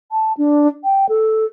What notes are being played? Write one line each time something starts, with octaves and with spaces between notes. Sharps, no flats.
A5
D4
G5
A4